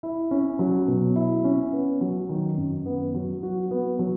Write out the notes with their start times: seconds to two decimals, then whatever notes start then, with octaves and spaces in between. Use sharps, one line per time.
0.03 E4
0.31 C#4
0.59 F#3
0.88 B2
1.16 E4
1.44 C#4
1.73 B3
2.01 F#3
2.29 D#3
2.57 F#2
2.86 B3
3.14 F#3
3.43 F#4
3.71 B3
3.99 F#3